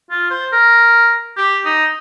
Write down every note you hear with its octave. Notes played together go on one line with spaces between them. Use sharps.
F4
C5
A#4
G4
D#4